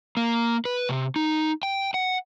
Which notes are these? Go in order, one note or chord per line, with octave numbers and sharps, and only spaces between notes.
A#3
B4
C3
D#4
G5
F#5